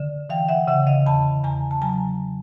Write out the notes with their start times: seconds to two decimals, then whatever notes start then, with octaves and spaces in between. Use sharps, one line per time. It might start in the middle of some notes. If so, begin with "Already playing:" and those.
Already playing: D3
0.30 E3 F5 G5
0.49 E5 F#5
0.67 C#3 E5 F#5
0.87 D#5 F5
1.06 E2 A5 B5
1.44 E2 G#5 A#5
1.71 A5
1.82 F#3 G#5 A#5